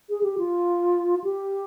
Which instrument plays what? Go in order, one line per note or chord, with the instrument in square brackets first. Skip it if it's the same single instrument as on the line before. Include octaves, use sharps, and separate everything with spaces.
[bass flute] G#4
G4
F4
G4